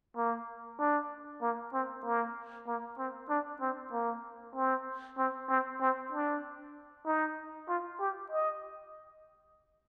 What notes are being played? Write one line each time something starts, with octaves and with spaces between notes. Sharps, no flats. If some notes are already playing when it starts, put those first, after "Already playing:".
A#3
D4
A#3
C4
A#3
A#3
C4
D4
C4
A#3
C4
C4
C4
C4
D4
D#4
F4
G4
D#5